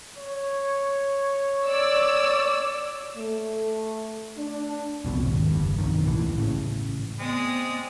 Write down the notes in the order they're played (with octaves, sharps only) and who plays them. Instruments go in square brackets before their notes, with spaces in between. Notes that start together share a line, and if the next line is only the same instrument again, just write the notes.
[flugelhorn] C#5
[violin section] D5 E6
[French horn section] A3
D4
[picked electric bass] C2 F2 B2
G#1 D#2
F#1 G2
B1 F2 D#3
D#2 A2 E3
A1 A2 C#3
[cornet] G#3 [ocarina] B3 [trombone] C4 [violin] D5 D#6